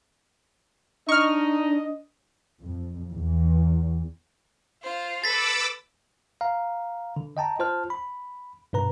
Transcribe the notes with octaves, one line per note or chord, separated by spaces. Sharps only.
D4 D#4 D#5 C#6 F6
F2
E2
F4 C5
A4 B4 D6 E6 A6 B6
F5 A#5
D3
D#5 G5 A5 A#5
F4 C5 A5 F6
B5
G2 B2 B4 A#5